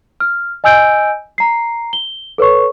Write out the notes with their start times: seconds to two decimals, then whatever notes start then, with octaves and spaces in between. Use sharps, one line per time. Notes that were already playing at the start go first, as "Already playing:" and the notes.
0.20 F6
0.64 D#5 G#5 E6 G6 D7
1.38 A#5 C7
1.93 G7
2.38 A4 B4 C#5 C#6